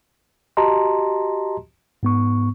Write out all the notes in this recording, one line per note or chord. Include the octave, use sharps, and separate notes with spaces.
F#4 G4 D#5 A5 A#5 C6
G#2 B3 C#6